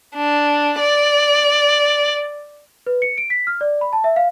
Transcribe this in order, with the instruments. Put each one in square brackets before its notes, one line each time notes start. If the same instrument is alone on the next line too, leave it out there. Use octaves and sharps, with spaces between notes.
[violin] D4
D5
[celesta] B4
C#7
D7
B6
F6
D5
B5
A5
E5
F5